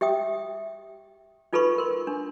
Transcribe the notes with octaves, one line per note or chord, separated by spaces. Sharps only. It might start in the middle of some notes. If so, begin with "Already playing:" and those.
G4 E5 G5 D#6
D#4 F4 A4 B4 B5 C#6
A#4 C6
D4